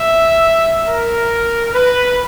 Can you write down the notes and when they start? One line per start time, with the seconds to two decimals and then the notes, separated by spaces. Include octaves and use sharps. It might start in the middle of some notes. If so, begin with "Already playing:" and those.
Already playing: E5
0.88 A#4
1.73 B4